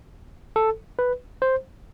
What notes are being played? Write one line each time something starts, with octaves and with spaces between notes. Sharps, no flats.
A4
B4
C5